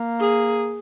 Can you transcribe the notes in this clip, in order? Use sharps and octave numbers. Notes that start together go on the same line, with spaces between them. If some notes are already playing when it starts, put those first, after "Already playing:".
Already playing: A#3
G#4